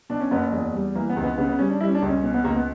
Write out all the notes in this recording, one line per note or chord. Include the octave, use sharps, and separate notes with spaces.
B2 D4
C#4
F#1 B3
C#4
E2
G3
E3 A#3
B3
C#2
B3
C#3 B3
B3
G3 C#4
D4
G3 E4
C#4
D4
C#2
C#4
B2 C#4
B3
C#2 A#3
B3